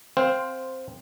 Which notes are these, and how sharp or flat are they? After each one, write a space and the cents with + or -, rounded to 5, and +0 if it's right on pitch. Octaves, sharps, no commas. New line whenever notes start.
C4 +0 C5 +0 F5 +15